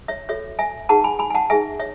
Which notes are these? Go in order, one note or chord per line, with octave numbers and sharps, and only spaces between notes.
C#5 E5
F#4 A4 C#5 E5
E5 G#5
D#4 G#4 B4 F#5 A5
G#5 B5
G#5 B5
G#5
F#5 A5
D#4 G#4 B4 E5 G#5
C#5 E5